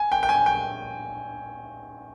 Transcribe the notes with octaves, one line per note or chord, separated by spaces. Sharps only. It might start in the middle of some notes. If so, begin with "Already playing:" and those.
Already playing: G#5
G5
G5
G#5
G5